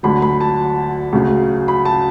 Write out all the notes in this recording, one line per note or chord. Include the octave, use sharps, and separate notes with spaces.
D2 D3 F#3 B5
B5
A5
D2 C#3 F#3
B5
A5